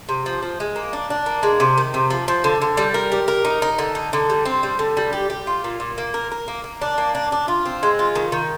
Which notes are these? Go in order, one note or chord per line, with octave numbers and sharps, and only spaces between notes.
C3
F3
F3
G#3
A#3
D4
D4
A#3
G#3
C3
D#3
C3
F3
F3
D3
D3
G3
A#4
G4
A#4
D#4
D#4
D3
D#4
D3
G3
C4
G3
D3
G3
G4
G4
F4
A#2
A#2
A#3
A#4
A#4
A#3
A#3
D4
A#3
D4
D4
F4
C4
G#3
F4
D#3
D#3